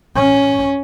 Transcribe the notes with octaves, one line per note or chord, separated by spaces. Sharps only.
C#4